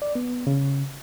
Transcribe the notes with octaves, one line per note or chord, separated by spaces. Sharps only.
D5
B3
C#3